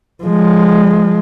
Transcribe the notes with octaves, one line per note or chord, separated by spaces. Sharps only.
F3 G#3